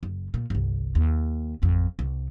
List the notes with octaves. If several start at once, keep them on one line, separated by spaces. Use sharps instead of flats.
F#1
A#2
G1 C2
D#2
A1 F2
C2